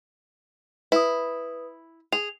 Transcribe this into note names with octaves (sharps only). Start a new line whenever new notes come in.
E4 B4 D#6
G#4 F7